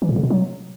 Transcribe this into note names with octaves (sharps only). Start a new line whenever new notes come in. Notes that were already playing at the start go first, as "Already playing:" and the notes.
E3
A#2
C#3
B2
F#3